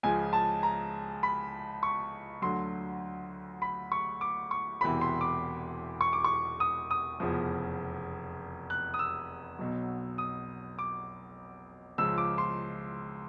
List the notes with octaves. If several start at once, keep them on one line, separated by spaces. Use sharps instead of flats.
C#2 C#3 F3 G#5
A5
A#5
B5
C#6
D2 D3 F#3 C6
B5
C#6
D6
C#6
E1 E2 C3 E3 B5
C6
D6
C#6
D6
C#6
D#6
D#6
F1 E2 C#3 F3
F#6
D#6
E6
B1 B2 F#3
D#6
D6
C#2 C#3 F3 E6
D6
C6